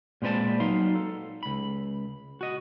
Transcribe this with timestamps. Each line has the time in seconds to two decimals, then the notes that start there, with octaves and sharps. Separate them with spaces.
0.22 A#2 G#3 C4 B4 D5 A5
0.60 F#3 D#4 F5 C6
0.95 A4
1.43 C#2 B5
2.41 F#4 D#5